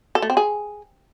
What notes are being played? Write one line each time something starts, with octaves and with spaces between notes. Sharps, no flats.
A4
A3
C4
G#4